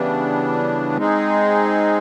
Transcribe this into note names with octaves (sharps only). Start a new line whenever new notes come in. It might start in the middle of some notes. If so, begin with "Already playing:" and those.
Already playing: C#3 E3 G3 B3 D4
G#3 C4 D#4 G#4